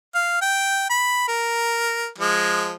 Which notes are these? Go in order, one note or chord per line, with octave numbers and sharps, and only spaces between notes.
F5
G5
B5
A#4
F3 G#3